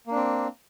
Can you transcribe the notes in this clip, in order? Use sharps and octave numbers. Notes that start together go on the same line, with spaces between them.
A#3 C4 D4